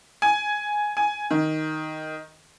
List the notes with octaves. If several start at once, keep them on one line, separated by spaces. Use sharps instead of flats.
G#5
G#5
D#3